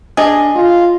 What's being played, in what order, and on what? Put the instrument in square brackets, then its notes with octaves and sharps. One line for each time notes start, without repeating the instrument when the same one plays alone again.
[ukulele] D4 D#5 [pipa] G#4
[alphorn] F4 [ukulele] D#5